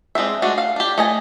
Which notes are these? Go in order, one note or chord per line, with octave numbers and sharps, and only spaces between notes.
G#3 C4 D4 E5
G#3 A3 D4 F#4
F5
D4 G4
A3 D#5 G#5